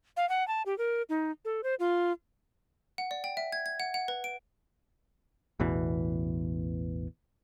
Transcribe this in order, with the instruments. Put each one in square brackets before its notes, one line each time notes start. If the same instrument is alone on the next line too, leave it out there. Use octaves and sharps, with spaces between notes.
[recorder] F5
F#5
A5
G4
A#4
D#4
A4
C5
F4
[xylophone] F#5
D5
G5
E5
G#6
G#6
F#5
F#5
B4
D7
[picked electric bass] A1 E2 B2 E3